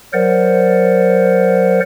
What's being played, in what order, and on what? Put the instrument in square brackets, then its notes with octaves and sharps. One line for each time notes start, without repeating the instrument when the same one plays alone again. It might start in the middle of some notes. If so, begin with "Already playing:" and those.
[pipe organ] F#3 A#4 C5 D5 F#5